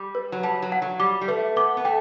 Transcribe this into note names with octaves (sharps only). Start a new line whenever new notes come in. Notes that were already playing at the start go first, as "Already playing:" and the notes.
Already playing: G3 D6
B4
F#3
G3 A5
F#3
F#5
F#3
G3 D6
G3
A3 B4
B3 D6
B3
A3 G5